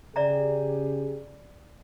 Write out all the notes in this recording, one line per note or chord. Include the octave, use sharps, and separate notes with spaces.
C#3 G4 G#4 D5 E5 A#5